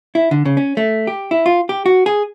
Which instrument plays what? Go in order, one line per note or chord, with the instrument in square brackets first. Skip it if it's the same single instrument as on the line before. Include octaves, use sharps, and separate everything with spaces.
[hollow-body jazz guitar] E4
D3
C#3
C#4
A3
G4
E4
F4
G4
F#4
G#4